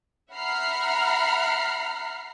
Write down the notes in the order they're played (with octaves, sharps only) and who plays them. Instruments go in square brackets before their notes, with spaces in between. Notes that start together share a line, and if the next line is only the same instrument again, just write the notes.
[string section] E5 F#5 A#5 B5 F6 C7